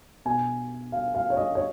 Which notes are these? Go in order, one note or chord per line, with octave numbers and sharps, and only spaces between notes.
B2 G#5
F5
F5
C#5
D#5
C#5